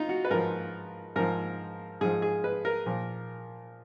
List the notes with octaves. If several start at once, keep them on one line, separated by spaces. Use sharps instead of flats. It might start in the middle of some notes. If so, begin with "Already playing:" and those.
Already playing: D#4 F4
F#4
B4
G#2 F3 A#4
G#2 F3 A#4
G#2 F3 G#4
G#4
B4
A#4
A#2 F3